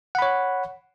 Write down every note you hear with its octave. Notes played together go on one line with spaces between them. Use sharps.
C#5 F#5 B5